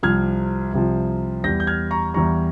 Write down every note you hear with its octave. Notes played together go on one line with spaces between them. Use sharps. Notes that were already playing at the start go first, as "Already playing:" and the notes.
C2 C3 F3 F6 G#6
C2 C3 F3
E2 E3 G3 G6 A#6
G6
F6 G#6
A#5 C#6
E2 E3 G3 A#5 C#6